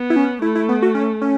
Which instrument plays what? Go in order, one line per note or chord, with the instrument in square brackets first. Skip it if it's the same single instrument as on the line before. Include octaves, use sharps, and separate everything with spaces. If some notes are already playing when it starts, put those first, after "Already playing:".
Already playing: [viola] B3
[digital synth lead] E4
C#4
[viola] A3 [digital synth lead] E4
[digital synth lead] E4
B3
F#4
C#4
C#4